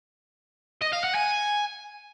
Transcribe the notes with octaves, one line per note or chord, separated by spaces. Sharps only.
D#5
F5
F#5
G#5